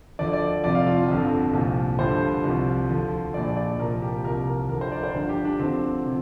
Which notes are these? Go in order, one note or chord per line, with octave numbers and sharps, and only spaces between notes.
D2 D3 F3 D5
D5
F1 F2 F3 D5
F5
F4
F4
G1 F2 D3 F3
C2 A#2 F3
G1 G2 D3 F3 C5
C2 C3 F3
D2 D3 F3
A#1 A#2 F3 D5
D5
C2 A#2 F3 A#4
G4
C2 C3 F3 A#4
A#4
D2 D3 F3 A#4
C5
D5
C5
G1 G2 F3 D4
G4
D4
D2 D3 F3 C4
C3 F3